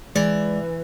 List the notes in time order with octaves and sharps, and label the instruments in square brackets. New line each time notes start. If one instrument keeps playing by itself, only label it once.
[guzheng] E3 [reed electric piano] G#3 [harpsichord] D5